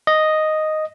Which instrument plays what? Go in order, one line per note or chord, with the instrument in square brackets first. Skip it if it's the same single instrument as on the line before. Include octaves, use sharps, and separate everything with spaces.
[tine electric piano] D#5